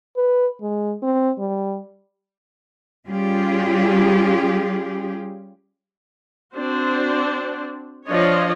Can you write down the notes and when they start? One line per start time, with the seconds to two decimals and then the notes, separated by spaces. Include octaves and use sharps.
0.17 B4
0.62 G#3
1.03 C4
1.38 G3
3.08 G3 C#4 F4 G4 G#4
6.55 C4 D4 F#4 C5
8.08 F3 D4 F4 C#5 D#5